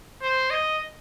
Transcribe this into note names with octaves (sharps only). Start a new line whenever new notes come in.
C5
D#5